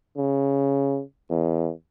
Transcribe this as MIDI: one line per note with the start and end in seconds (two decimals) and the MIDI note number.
0.17 1.02 49
1.30 1.71 40